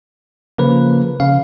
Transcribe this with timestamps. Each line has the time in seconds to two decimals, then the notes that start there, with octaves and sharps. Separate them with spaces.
0.58 C#3 F3 A#3 B4
1.20 C#3 F5